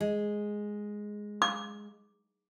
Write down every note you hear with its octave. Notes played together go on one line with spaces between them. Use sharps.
G#3
D6